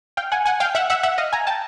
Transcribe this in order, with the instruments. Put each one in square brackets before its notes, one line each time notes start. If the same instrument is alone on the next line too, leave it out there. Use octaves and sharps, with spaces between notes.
[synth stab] F5 G5
F#5 G#5
F#5 G#5
F5 G5
E5 F#5
E5 F#5
E5 F#5
D#5 F5
G#5 A#5
G5 A5